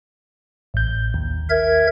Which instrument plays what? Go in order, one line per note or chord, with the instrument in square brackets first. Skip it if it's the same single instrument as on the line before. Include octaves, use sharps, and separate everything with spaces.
[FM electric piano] A1 G6
D#2
[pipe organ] A#4 E5 G#6